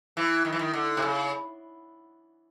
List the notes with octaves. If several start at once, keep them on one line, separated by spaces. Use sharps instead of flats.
E3
D#3
E3
D#3
D3
C3
C#3